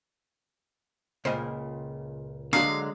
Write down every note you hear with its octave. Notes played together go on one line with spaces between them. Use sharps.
C#2 A#2 C#3 C5 D#5
D3 F#3 G#3 A#3 D4 F#4 F5